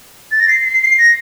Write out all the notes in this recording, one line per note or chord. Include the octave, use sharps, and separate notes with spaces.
A6
A#6
C7
C7
C7
A#6